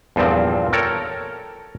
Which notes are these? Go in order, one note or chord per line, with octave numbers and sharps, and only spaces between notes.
E2 G2 A#2 F3 C4
A4 A#4 C#5 G5